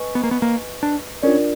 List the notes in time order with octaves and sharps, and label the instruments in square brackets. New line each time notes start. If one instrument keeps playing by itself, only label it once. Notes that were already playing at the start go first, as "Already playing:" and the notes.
Already playing: [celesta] B4 D#5 G#5 C#6
[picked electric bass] B3
A#3
B3
A#3
D4
[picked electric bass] C#4 [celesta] D4 F4 A#4 D5